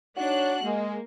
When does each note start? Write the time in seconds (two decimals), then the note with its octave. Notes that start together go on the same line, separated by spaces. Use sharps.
0.17 D4 D#4 F#4 C#5 F#6
0.63 G#3 A#3